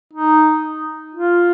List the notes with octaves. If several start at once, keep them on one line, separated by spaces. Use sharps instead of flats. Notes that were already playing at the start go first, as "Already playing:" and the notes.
D#4
F4